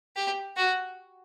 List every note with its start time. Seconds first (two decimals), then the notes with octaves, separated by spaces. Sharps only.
0.16 G4
0.56 F#4